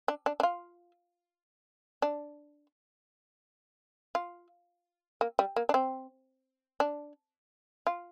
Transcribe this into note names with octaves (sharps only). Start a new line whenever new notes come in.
D4
D4
D4
F4
D4
F4
A#3
G3
A#3
D4
C4
D4
F4